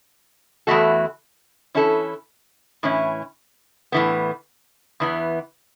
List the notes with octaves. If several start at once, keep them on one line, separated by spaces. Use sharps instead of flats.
E2 E3 A3 F#4 A4
E3 C#4 E4 A4
A2 E3 C#4 E4
A2 E3 B3
E2 E3 B3